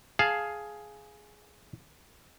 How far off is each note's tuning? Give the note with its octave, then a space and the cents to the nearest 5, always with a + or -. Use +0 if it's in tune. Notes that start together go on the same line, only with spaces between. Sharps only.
G#4 +5 F5 +0 A5 +0